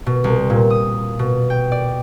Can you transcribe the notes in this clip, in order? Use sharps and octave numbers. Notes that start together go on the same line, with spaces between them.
B2
C2
A#2
D#6
B2
G5
D5